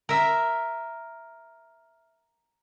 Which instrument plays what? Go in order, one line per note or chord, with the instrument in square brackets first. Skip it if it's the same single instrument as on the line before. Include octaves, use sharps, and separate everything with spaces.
[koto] A#4 E5